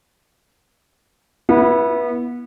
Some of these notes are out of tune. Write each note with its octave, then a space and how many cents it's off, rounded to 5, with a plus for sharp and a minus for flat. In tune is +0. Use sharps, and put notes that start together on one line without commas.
B3 -25 E4 +0